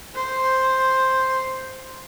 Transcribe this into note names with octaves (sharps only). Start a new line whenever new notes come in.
C5